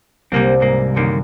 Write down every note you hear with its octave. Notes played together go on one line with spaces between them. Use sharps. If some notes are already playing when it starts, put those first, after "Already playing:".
C2 C3 G3 A#3 C4
G#2 A#3
F#2 D3 D#3 A#3